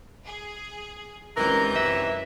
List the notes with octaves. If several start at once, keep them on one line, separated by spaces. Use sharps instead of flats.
G#4
C#2 C3 D#3 E3 A#4 A#5 G6
F#2 E5